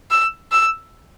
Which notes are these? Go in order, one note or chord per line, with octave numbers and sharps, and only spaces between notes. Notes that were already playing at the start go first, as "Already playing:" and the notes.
E6
E6